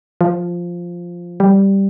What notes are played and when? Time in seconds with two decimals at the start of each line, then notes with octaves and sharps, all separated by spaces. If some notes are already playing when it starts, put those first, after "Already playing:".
0.21 F3
1.40 G3